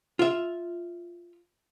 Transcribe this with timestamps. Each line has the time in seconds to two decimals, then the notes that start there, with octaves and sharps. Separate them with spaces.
0.19 F4 E5